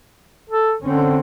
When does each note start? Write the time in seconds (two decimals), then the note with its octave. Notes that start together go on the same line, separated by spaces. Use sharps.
0.50 A4
0.83 D3 C4 C#4